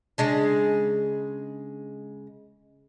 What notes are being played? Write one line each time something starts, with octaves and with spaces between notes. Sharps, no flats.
C#3 G#3 D4